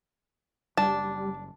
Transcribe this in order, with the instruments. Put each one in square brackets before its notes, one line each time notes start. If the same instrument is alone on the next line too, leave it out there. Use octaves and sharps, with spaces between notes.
[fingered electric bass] F#1 [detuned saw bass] G3 [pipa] D4 [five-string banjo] A5